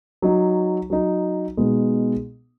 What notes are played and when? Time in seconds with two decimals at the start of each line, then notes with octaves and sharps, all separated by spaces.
0.22 F#3 D#4
0.90 F#3 D#4
1.57 B2 G#3 B3 D#4